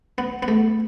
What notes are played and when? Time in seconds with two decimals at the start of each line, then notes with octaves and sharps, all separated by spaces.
0.18 B3
0.43 B3
0.48 A3